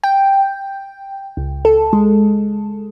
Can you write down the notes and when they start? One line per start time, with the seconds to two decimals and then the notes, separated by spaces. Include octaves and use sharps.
0.03 G5
1.37 C#2
1.65 A4
1.93 G#3